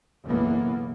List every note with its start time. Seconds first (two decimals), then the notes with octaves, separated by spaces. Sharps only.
0.25 F#1 B1 E3 A#3 B3